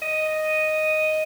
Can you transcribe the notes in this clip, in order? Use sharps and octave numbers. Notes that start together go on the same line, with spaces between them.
D#5